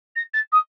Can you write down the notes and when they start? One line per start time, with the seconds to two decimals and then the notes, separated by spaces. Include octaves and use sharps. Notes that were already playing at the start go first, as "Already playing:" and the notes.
0.16 A#6
0.34 A6
0.52 D#6